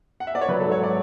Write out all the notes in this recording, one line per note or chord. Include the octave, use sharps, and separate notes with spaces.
F#5
E5
D5
C#5
F#3 B4
A4
G#2
C#5
D5